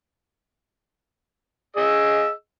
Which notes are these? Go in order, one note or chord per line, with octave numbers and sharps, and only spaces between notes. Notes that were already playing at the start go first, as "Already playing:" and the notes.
G#4 D#5 E6